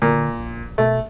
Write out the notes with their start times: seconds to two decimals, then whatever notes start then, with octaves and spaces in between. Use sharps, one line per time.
0.02 A#2 D3
0.38 A#1
0.78 B2 A3